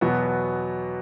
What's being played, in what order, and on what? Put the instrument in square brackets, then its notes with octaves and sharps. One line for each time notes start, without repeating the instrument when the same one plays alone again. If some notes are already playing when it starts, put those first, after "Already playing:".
[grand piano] E2 B2 F#3 B3